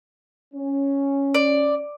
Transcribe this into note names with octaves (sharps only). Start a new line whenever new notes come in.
C#4
D5